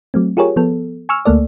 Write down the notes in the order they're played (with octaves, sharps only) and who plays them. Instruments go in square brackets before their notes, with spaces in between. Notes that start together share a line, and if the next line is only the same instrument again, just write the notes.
[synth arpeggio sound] F#3 A3 C4
F4 G4 G#4 A#4 C#5
F3 B3 A4
G#5 C#6 E6 F6
D2 A3 A#3 A4 D5